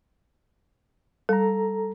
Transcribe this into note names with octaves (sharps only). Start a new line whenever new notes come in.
G3 A4 A#5